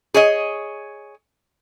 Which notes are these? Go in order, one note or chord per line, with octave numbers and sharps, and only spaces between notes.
G#4 C#5 D#5